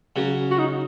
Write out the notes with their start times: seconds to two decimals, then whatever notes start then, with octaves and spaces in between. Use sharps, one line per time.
0.16 C#3 F#3
0.51 F#4
0.59 D#4